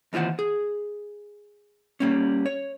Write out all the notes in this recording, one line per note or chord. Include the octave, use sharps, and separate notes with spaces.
D#2 E3 F4 C5 F#5
G#4
G3 A#3 C#4
C#5